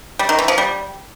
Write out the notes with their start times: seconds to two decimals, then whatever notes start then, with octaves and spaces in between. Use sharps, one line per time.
0.19 G3
0.29 D#3
0.39 E3
0.48 F3
0.58 G3